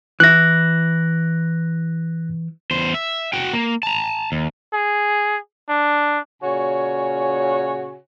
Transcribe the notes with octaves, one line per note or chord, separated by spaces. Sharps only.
E3 E4 F#6 A#6
E2 C5
E5
F#4 G5
A#3
A5 A#5
D#2
G#4
D4
A#2 C#3 F#4 C#5 G#5